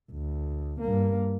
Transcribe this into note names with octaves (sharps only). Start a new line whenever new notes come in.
D2
G2 A#3